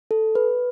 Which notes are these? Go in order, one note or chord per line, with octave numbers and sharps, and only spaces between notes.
A4
B4